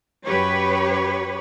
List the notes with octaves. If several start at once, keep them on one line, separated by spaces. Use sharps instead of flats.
F#2 G4 B4 C#5